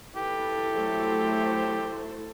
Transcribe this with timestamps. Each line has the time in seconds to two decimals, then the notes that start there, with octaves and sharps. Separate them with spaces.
0.16 E4 G4 A4 B4
0.72 F#3 A3 C5